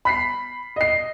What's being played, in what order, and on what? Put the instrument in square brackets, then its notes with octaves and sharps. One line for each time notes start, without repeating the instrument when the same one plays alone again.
[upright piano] B5 B6 C7
D#5 C7